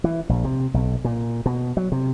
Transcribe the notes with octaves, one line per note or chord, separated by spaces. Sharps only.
E3
A#1
C3
B1
A#2
B2
F#3
C3